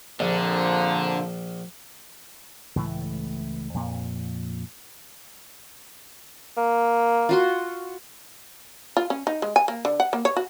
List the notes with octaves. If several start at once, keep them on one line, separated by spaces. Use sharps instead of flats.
A#1 F2 D3 F3 A#3
C#2 A2 E3 A3
F2 A#2
A#3
F4 F#4 C6
F4
C#4
D#4
G#3
G#5
A#3
D3
F#5
A#3
C#5
F#4